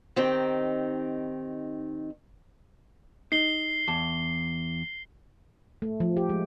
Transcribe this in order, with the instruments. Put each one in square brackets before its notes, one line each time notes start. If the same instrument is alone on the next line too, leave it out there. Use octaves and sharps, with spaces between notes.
[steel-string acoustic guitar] D#3 C4 D#4 G4
[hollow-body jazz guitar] D#4 [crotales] C7 G7
[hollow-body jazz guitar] E2 A5
[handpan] A3
F3
G4
G#3